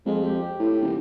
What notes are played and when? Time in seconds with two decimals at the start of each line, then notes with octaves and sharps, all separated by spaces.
0.06 F2 G#3
0.23 G4
0.59 A2
0.82 D#1